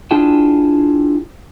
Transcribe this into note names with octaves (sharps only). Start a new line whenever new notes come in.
D4 E4 F4 G#4 G5 A5